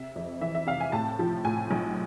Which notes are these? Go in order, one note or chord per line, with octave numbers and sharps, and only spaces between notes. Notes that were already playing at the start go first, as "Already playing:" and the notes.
Already playing: C3 E5
F2
E3 E5
E5
C3 F5
G#5
A2 A5
F3
A2 G#5
B1